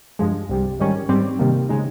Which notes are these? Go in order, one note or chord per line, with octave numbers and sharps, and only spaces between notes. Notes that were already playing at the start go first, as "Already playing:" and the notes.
G2 F3 G#3
C2 C3 G3
G#2 D#3 G3 C#4
G#2 G3 C4 G4
C3 D#3 G3 A#3
C#3 G#3 D#4